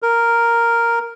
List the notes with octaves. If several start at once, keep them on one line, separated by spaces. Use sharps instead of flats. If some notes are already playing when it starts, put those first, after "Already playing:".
A#4